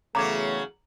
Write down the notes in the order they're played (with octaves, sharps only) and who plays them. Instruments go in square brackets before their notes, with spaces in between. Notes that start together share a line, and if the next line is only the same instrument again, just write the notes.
[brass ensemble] E2 A3 [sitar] C#3 F#3 [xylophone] A#5 D6 G#6